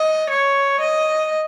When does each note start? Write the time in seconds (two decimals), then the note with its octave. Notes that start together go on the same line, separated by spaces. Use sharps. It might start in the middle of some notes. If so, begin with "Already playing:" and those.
Already playing: D#5
0.29 C#5
0.80 D#5